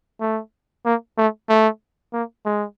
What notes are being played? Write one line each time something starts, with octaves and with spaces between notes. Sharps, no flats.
A3
A#3
A3
A3
A#3
G#3